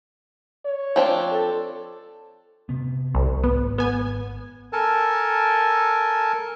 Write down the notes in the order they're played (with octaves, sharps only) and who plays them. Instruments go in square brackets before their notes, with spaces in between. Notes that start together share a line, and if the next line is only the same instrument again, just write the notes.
[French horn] C#5
[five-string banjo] F3 C4 D4
[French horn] A4
[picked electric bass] C3 B3
[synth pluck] C2
[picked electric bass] G#1 [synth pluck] B3
[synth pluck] B3 G#5
[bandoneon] A4 A#4 G#5 A5